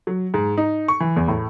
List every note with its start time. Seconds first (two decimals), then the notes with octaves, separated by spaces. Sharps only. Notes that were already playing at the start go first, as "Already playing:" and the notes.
0.07 F#3
0.34 G#2
0.57 D#4
0.88 C#6
1.00 E3
1.16 E2
1.28 A2